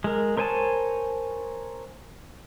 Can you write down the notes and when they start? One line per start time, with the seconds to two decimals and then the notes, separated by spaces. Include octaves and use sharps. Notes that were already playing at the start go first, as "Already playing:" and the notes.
0.04 G#3 A#4
0.37 A#4 C5 C#5 G#5 A5